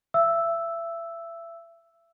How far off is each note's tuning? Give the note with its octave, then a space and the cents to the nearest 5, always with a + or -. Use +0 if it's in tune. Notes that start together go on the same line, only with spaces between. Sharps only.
E5 +30 E6 +0